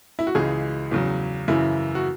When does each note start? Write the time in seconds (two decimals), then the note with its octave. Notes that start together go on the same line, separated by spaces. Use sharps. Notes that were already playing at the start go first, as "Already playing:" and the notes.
0.19 E4
0.27 F#4
0.35 C#2 C#3 E3 G#3 G#4
0.92 E2 C#3 F#3
1.48 F#2 C#3 E3 E4
1.95 F#4